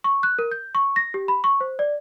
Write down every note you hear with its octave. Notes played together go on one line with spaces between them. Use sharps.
C#6
F#6
A#4
G6
C#6
A#6
G4
B5
C#6
C5
D5